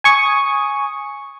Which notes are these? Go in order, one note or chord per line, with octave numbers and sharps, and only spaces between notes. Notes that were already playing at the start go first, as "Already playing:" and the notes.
G#5 C#6 D#6